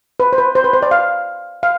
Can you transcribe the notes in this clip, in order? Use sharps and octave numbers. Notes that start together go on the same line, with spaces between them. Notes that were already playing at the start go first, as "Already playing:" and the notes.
B4
C5
B4
C5
B4
C5
D5
F5
F5